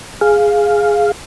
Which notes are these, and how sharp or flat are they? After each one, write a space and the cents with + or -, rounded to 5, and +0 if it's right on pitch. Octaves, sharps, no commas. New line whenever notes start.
G#4 +0 F5 +0